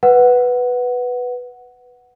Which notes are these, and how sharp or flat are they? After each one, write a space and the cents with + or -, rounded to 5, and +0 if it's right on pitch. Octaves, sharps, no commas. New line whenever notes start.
B4 +0 F#5 +0